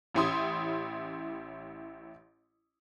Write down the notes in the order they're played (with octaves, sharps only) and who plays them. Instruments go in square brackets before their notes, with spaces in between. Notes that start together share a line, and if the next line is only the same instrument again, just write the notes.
[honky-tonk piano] A1 C#4 E4 G4 C6 D#6